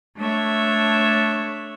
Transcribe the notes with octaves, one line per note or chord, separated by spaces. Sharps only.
A3 D4 C#5 E5